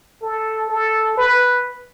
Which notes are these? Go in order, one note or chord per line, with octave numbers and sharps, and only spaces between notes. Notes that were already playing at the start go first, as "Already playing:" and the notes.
A4
A4
B4